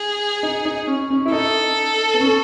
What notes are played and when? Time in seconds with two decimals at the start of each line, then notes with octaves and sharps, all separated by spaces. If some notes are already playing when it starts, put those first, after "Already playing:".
Already playing: G#4
0.43 D#4
0.65 D#4
0.87 C#4
1.10 C#4
1.26 E4
1.32 D#4 A4
2.13 B3
2.20 C#4